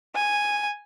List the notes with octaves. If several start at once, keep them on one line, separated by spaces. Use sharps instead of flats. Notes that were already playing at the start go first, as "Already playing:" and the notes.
G#5